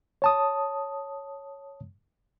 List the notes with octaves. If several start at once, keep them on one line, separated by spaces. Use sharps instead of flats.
C#5 A5 D#6